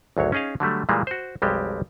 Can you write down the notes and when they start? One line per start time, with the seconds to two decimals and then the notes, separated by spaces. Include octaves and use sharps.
0.17 G#1 D2 F#3 C#5
0.32 C#4 D#4 G#4 D#5 F5
0.60 D3 F#3 G3 A3
0.89 A#2 E3 G3 G#3 A#3
1.07 F#4 C5
1.42 B1 F2 G3 G#3 G4 G5